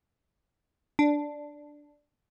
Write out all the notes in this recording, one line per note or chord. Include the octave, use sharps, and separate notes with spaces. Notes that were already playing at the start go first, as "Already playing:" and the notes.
D4